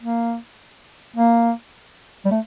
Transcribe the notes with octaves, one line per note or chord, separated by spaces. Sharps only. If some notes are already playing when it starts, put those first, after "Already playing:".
A#3
A#3
G3
A3